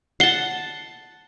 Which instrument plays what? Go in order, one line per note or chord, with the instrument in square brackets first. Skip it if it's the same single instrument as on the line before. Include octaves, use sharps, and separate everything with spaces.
[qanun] F#5 A5 [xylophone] C7 G7